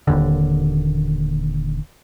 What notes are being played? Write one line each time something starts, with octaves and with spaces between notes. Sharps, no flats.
D#1 D#2 D3